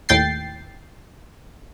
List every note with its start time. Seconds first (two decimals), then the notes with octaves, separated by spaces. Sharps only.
0.09 D#2 A2 G5 A6 C7